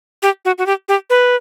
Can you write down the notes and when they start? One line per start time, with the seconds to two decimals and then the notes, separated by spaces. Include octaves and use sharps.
0.23 G4
0.45 F#4
0.58 F#4
0.66 G4
0.88 G4
1.10 B4